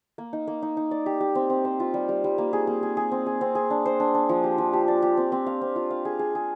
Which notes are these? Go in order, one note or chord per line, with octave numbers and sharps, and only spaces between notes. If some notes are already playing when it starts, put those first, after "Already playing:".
A#3
D#4
A#3
D#4
D#4
D5
G4
G4
C4
C4
C5
F4
G3
G3
G3
A#3
G#4
A#3
G#4
G#4
C4
G#4
C4
G#4
D4
C5
D4
D4
F3
G4
F3
G4
D5
G4
C4
C4
F5
C4
F4
F5
G#4
G#4
G#4